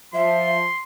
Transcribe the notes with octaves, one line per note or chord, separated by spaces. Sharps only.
F3 E5 C6